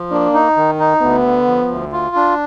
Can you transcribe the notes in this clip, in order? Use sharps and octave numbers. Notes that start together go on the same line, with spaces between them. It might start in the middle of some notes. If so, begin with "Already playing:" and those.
Already playing: F3
A#3 D4
D#4
D#3
D#4
D2 B3
D3
F3
D2
F4
D4